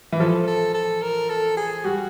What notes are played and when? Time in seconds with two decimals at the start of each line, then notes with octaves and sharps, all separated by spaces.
0.12 E3
0.20 F3 A4
0.47 A4
0.75 A4
1.02 A#4
1.30 A4
1.57 G#4
1.85 G3 F#4